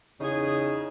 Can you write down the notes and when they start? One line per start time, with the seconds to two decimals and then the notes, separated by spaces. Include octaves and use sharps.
0.20 E2 C#3 D#4 G#4